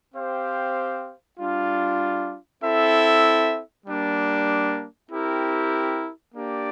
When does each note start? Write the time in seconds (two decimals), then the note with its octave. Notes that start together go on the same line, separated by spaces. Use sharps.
0.14 C4 G4 C5 F5
1.39 G3 D4 F4
2.63 C4 E4 A4 E5
3.86 G3 A#3 D4
5.11 C4 E4 G4 A#4
6.35 A#3 D4 G4 D5